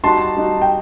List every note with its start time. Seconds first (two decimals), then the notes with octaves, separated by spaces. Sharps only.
0.04 G3 D#4 F#4 A5 C6
0.37 G3 D#4 F#4
0.62 G5